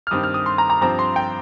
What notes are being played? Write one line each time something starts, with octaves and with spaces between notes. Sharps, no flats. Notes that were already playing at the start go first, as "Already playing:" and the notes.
F6
G2 D#3 C4 D#6
F6
D#6
C6
A#5
A#5
G2 F3 C4 A#5
C6
G5